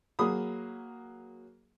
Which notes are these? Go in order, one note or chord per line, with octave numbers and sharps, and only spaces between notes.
F#3 A#3 G#4 B5 D#6